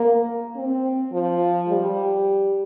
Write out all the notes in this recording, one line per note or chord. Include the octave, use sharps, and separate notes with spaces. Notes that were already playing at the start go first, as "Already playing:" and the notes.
Already playing: A#3
C4
F3
G3